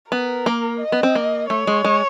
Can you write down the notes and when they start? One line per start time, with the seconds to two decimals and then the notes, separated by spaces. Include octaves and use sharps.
0.12 B3 A#4
0.46 A#3
0.81 D#5
0.92 B3
1.03 C4
1.15 A#3
1.49 A3 C#5
1.67 G#3
1.84 G#3